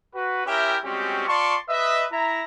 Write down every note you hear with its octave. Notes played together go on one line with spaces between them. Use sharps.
F#4 B4
C#4 E4 G4 A#4 E5 G5
G3 G#3 C4 C#4 F#4 G4
F4 D5 A5 C6 C#6
B4 D#5 E5
E4 A#5